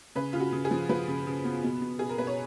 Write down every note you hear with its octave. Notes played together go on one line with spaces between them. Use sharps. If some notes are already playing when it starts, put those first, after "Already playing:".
C#3 B4
C#3 F4
F#4
C#3
G#4
F3
F3 B4
C#3
C#3
B3
B2
B2
B2 G#4
A#4
B2 B4
C#5